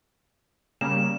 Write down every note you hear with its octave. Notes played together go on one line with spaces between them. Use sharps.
C#3 G3 A#3 E7